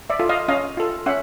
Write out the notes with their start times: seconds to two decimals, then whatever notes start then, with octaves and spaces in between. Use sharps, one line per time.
0.10 D5 E5
0.20 F4 A4
0.29 D#5 F5
0.48 C#4 D#5 F5
0.77 F4 A4
1.06 C#4 E5 F#5